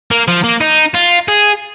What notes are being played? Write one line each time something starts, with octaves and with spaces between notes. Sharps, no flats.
A#3
F3
A#3
D#4
F4
G#4